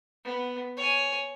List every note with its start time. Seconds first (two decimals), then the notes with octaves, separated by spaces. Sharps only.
0.25 B3
0.77 C#5 G#5